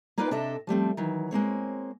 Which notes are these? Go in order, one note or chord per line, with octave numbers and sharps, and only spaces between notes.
A#3 D#4 F4 B4 D5
C3 D4 A4 D#5 E5
F3 G3 A3 C4
D#3 E3 F#3
G#3 A#3 C4 C#5